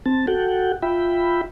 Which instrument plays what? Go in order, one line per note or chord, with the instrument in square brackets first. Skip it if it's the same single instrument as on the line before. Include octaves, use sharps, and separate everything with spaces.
[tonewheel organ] C4 A5
F#4 A4 F#5 G5
F4 E5 G5 B5